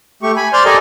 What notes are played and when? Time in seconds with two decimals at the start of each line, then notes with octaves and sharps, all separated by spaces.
0.23 A3 G4 C#6
0.36 G#5 B5
0.53 C5 D5 C6 F6 G6
0.65 G4 A4 A#4 D5 D#5 G#5